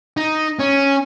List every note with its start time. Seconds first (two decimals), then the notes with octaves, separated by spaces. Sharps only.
0.17 D#4
0.59 C#4